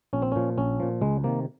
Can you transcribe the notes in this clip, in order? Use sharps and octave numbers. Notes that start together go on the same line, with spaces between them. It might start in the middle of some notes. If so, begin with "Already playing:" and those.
A#1 C#4
C4
A#2 F3 C#4
A#1 C#4
A#2 F3
C#2 G#3
C3 D#3 A#3